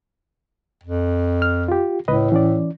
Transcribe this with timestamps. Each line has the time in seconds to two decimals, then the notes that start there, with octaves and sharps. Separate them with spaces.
0.83 F2
1.42 F6
1.68 F4 G4
2.08 C#2 A2 B4 D#5
2.32 E3 C#4 D5